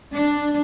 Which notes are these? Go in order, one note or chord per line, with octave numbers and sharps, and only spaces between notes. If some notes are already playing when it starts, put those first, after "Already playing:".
D4